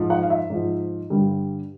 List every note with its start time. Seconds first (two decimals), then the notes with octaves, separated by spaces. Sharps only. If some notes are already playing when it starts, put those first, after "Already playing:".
Already playing: G#2 F3
0.10 F#5
0.23 F5
0.30 E5
0.50 G#2 F3
1.10 G2 D3 G3